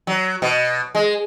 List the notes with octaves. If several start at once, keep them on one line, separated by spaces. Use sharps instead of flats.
F#3
B2
G#3